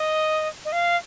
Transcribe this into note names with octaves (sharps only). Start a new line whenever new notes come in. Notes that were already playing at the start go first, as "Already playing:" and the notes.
Already playing: D#5
D#5
F5